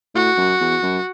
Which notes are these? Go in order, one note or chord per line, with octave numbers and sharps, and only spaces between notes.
A2 F#4
F#2
E2
F#2